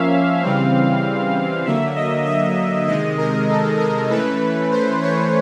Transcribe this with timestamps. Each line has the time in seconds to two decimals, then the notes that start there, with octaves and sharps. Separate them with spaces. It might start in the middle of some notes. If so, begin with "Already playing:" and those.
Already playing: F3 A#3 C#4 E5 F5
0.42 C#3 E3 G3 C4
1.65 D3 F#3 A#3 E5
1.95 D#5
2.26 E5
2.87 C3 D#3 G#3 D#5
3.18 A#4
3.49 A4
3.79 A#4
4.10 E3 A3 C#4 B4
4.71 C5
5.02 C#5